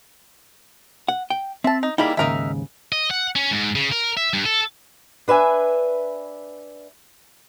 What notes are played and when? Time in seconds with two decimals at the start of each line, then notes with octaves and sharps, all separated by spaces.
1.08 F#5
1.30 G5
1.64 C4 E5 A5
1.83 D#4
1.98 G3 A#3 D#4 E4 G#4 B5
2.17 D#2 G#2 C#3 D#4 A#4 E5
2.92 D#5
3.11 F#5
3.36 C#4
3.51 G#2
3.75 C#3
3.92 A#4
4.17 E5
4.33 G2
4.46 A4
5.28 D4 B4 E5 G#5